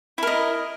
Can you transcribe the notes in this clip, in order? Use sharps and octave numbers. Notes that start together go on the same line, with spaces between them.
E4 A#4 D#5